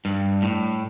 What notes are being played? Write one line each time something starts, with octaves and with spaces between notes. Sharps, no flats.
G2
A2